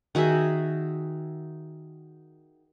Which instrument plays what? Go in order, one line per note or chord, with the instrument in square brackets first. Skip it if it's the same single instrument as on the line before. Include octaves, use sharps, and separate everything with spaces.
[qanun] D#3 F#4 G#4 E5